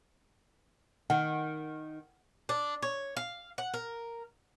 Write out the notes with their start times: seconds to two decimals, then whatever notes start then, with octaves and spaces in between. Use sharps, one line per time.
1.10 D#3 F#5
2.49 D4
2.82 C#5
3.17 F5
3.58 F#5
3.74 A#4